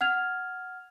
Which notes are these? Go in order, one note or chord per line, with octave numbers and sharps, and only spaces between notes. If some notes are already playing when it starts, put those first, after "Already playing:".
F#5 F6 G#6 F7